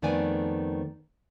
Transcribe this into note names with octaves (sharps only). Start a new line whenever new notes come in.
F2 D#3 A3 B3 D5 G#5